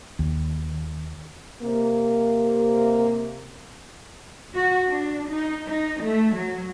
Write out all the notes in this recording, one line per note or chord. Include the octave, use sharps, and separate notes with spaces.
D#2
C3 A#3
F#4
D4
D#4
D#4
A3
F#3